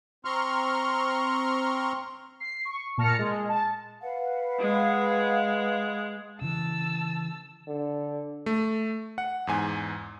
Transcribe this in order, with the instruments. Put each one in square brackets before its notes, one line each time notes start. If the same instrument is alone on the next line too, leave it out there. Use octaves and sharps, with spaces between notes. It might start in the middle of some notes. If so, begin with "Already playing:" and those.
[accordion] C4 A#5 C6 C#6 F6
[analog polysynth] C7
C#6
A#2 A5 F6 A#6 C#7
G#3
A5
[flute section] B4 F5 F#5
[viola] G#3
[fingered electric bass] C#3 E3 [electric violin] A5 E6
[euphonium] D3
[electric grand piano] A3
F#5
E2 G#2 G#5